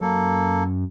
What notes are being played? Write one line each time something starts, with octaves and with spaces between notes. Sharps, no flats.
F#2 A#3 A4